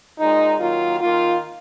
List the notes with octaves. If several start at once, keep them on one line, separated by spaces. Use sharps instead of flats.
A#2 G#3 D#4
D#3 F#3 A#3 F4
D#3 A#3 F4